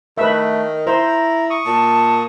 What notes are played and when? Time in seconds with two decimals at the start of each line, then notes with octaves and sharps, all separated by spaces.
0.18 D#3 A3 B4 E5
0.87 E4 C5 A#5
1.50 C#6 D#6
1.66 A#2 A5